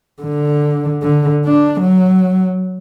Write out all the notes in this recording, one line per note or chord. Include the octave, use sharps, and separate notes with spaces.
D3
D3
D4
F#3